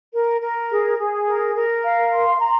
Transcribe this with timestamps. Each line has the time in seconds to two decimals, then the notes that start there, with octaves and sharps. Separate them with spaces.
0.14 A#4
0.41 A#4
0.70 G#4
0.98 G#4
1.27 A#4
1.55 A#4
1.84 F5
2.11 C6
2.40 A#5